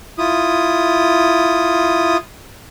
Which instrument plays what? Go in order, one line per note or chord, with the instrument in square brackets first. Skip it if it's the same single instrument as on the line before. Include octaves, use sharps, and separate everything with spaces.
[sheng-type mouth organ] E4 F4 D#6